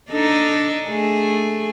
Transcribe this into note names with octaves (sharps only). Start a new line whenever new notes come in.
D4 D#4 A4
A3 G#4